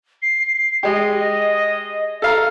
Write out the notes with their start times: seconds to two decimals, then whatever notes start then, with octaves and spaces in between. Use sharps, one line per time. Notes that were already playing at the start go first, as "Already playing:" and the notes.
0.22 C7
0.83 G#3 G4 D#5
2.22 A4 F5 A#5